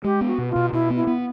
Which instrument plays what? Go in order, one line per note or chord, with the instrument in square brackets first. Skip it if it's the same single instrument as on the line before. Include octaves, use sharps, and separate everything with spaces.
[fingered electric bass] G#3 [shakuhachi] G4
[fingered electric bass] B3
[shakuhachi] F#4
[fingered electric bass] B2
[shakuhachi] F4
[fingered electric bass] B2
[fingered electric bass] B2 [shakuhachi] E4
[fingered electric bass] B3
[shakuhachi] E4
[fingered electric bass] B3